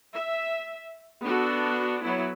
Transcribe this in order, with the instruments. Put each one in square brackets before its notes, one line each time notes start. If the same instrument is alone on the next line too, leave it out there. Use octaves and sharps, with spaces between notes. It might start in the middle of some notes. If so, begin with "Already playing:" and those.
[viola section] E5
B3 D4 F#4 A4
F#3 B3 E4